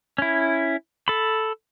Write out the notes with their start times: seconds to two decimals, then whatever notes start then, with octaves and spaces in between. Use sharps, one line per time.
0.18 C#4 E4
1.08 A4 B5